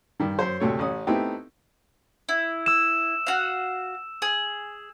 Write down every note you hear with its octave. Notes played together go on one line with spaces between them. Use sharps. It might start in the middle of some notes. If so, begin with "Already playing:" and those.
G2 D#3
F#2 C5
D2 C3 A3 C#5
A1 C#4 D#6
A3 B3 C4 D#4 E4 G4
E4
E6 E7
F#4 F5
G#4